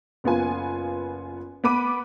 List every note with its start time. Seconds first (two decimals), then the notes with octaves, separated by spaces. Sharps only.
0.24 F#1 B3 F4 G#5
1.64 B3 B4 B5 D6 D#7